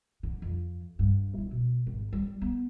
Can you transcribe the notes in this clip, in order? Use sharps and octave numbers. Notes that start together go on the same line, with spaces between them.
D3
F2
G2
E4
B2
G#1
G3
B3